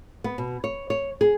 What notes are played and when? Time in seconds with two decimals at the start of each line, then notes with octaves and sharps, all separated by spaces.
0.24 B3
0.38 B2
0.64 C#5
0.90 C#5
1.21 G#4